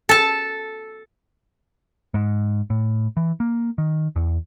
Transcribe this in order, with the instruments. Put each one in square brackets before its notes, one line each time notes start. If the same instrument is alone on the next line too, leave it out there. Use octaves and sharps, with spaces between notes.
[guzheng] A4 A5
[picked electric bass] G#2
A2
E3
A#3
D#3
E2